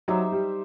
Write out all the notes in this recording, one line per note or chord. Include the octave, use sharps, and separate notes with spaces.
F#3 D#4 G4 C5 E5
G3